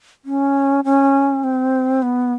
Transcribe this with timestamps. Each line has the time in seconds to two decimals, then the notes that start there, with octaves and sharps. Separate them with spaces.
0.25 C#4
0.84 C#4
1.44 C4
2.02 B3